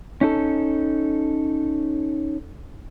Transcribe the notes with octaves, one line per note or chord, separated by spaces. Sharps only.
C#4 D#4 A4